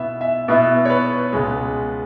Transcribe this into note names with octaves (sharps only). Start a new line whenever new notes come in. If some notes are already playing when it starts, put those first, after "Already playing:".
Already playing: B2 B3 E4 E5
E5
B2 B3 E4 E5
C#5
B4
C#2 B2 G#3